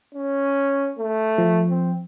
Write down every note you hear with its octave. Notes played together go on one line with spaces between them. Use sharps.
C#4
A3
F3
C4